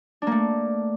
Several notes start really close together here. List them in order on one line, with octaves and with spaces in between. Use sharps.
D4 A#3 A3